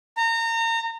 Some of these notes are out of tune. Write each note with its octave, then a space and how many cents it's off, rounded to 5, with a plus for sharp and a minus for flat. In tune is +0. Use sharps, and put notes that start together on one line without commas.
A#5 -30